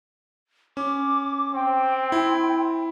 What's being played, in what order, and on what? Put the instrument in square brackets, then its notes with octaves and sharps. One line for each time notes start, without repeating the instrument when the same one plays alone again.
[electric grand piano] C#4 [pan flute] D6
[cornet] C4 [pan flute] G5
[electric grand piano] E4